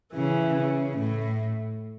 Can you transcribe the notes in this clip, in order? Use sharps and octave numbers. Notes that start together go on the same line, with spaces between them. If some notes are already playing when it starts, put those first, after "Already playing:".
C#3 E3
C#3
A2